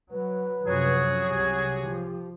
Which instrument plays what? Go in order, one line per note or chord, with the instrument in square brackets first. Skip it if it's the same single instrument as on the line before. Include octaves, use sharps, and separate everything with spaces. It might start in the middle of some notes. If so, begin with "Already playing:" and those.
[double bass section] F#3 [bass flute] B4
[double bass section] F#2 C3 F3 [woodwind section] F#3 F#4 G#4
[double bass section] C2 C3 [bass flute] G4
[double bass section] F3